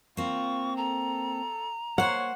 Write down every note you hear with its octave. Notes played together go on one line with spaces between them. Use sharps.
A#3 C4 F4 C#6
A4 A#5
A#3 C5 C#5 F#5